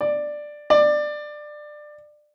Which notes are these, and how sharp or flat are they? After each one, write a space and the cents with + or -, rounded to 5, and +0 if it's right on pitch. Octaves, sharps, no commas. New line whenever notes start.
D5 +10
D5 +20